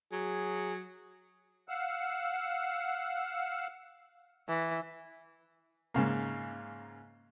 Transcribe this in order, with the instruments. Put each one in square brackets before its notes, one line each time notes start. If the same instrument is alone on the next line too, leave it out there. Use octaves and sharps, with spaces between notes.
[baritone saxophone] F#3 [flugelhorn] G#4
[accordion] F5 F#5 E6
[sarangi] E3
[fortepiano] G#2 C#3 A#3